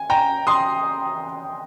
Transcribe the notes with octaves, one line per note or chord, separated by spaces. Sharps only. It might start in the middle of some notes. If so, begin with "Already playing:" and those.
Already playing: G#5
G5 A#5
C6 D#6